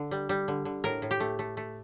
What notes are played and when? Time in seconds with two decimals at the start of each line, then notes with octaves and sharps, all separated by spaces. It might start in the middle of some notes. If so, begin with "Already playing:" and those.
Already playing: D3
0.11 G3
0.29 G3
0.48 D3
0.65 D3
0.84 A2 A#4
1.02 A2
1.11 G4
1.20 A3
1.39 A3
1.57 A3